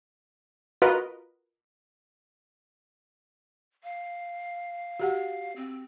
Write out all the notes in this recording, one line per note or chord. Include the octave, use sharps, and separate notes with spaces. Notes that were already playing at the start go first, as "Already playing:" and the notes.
F4 F#4 A#4 B4 D#5
F5
F#4 G4 F#5
C4